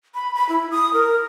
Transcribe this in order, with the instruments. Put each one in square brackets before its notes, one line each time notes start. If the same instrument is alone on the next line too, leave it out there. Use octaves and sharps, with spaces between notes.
[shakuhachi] B5
B5
E4
D#6
A#4